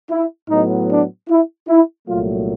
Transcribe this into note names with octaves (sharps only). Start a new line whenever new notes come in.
E4
A2 F#3 B3 D#4
D4
E4
E4
C2 A#2 F#3 A3 F4